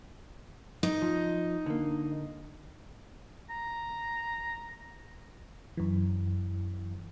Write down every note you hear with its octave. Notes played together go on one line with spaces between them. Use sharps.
D#4
F3
D3 A#3
A#5
F#2 E3